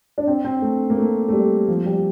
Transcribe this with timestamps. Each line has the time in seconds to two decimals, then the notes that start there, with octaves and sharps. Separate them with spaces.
0.18 D4
0.27 C4
0.44 C4
0.62 A3
0.90 A#3
0.98 A3
1.28 A3
1.33 G3
1.68 F3
1.86 G3